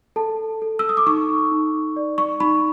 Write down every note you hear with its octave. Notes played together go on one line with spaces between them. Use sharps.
A4 A5
A4
E6
D#6
D6
D#4 C#6
D#4
D5
C#6
D#4 B5